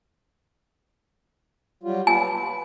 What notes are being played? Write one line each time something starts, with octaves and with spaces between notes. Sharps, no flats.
F#3 G3 F4
F4 B4 G#5
B4